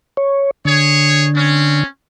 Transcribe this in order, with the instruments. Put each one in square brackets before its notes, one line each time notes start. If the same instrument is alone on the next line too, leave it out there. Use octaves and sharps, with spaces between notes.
[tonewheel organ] C#5
[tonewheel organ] D3 [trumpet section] G#4 C#5
[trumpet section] C4 C#4